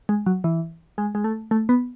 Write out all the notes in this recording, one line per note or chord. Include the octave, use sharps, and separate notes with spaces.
G#3
F#3
E3
G#3
G#3
A3
A3
B3